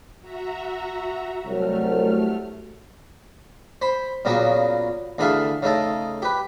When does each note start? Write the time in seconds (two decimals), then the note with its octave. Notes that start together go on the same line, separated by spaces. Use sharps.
0.21 F#4 E5 A#5
1.46 C2 F#3 A3 F6
3.82 C5 B5
4.25 A#2 C#3 F#3 B3 C#4
5.18 D2 E3 G#4 A4 E5 F5
5.63 C#3 A3 D#4 A4
6.22 G4 B4